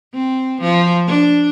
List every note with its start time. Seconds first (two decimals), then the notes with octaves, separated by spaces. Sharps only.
0.14 C4
0.62 F3
1.07 D4